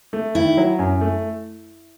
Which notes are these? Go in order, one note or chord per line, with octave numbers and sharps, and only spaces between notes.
A3
D#3 E4
F#3
F#2
A3